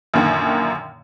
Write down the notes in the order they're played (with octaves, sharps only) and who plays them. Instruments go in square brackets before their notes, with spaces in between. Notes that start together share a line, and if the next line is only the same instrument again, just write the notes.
[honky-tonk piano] F#2 A#2 D3 D#3 A#3